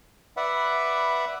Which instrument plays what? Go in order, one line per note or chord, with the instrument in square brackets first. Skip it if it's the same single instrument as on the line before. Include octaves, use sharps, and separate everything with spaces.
[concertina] B4 D5 E5 F#5